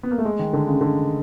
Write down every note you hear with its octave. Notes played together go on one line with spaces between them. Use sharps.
B3
A#3
A3
G#3
D#3
D3
C#3
D3